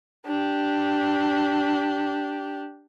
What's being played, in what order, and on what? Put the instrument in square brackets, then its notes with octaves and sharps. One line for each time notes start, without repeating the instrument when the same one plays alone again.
[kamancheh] D4 G4